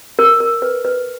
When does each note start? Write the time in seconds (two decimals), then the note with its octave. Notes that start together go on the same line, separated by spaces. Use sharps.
0.19 A#4
0.40 A#4
0.62 B4
0.85 B4